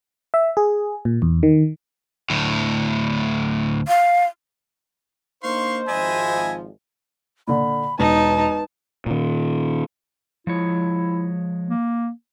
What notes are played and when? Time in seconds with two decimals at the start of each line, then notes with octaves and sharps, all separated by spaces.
0.34 E5
0.57 G#4
1.05 A#2
1.22 E2
1.43 D#3
2.30 D2 A2
3.88 F5
5.43 A#3 D4 D#4 C5 F5 C6 C#6
5.88 G#1 F3 D#5 E5 G#5 B5
7.47 A#2 D3 B5
7.99 E1 D#4 B4 A5
9.06 A#2 D#3
10.47 F3 G#3 E4 C#5
11.69 A#3